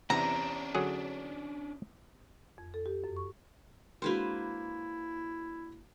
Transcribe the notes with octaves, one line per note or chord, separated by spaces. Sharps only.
E2 C3 C#4 D4 A#5
D3 F#3 G#4
F2
A4
G4
F#2
C#6
G#3 A#3 D4 E4 F#4 B4 C5